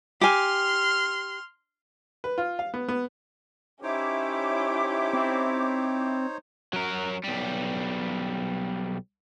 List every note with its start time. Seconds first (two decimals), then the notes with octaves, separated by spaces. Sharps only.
0.21 G4 G#5 C6 F6
2.24 B4
2.38 F4
2.59 F5
2.74 B3
2.88 B3
3.83 C#4 D#4 E4 G4 C5 C#5 D6
5.14 C4
6.73 F#3 A#4
7.24 B1 G3